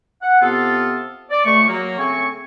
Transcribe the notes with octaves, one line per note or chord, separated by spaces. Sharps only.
F#5
C3 B3 F4 A4
D5
C#2 A3 C#6
F#3 A#3
C#3 A3 C4 G#5 C#6